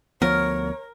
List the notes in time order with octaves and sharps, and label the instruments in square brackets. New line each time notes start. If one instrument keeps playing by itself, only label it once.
[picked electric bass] D2 F3 B3 [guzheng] A#4 [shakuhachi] C#5